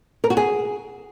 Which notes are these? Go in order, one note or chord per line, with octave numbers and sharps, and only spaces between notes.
A#4
F#4
G#4